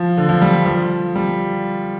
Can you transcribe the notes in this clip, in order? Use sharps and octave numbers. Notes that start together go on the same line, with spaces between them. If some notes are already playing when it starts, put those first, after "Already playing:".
Already playing: F3
D3
F3
G3
F3
G3